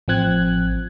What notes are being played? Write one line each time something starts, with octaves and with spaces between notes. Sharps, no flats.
A1 F3 C4 F#6 G#6